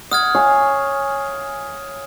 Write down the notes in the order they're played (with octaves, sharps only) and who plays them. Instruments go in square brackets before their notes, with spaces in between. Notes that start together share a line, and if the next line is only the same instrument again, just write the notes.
[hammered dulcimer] F#5 [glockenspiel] D#6 F6 G#6
[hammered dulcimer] C#5 F5 G#5